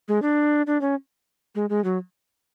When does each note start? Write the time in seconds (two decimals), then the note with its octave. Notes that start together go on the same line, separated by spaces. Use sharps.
0.08 G#3
0.22 D4
0.67 D4
0.81 C#4
1.55 G#3
1.70 G#3
1.84 F#3